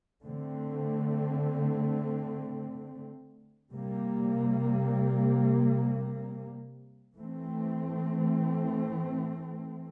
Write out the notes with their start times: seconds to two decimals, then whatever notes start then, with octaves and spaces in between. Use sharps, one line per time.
0.23 D3 A3 C4
3.70 C3 G3 A#3
7.16 E3 A3 C4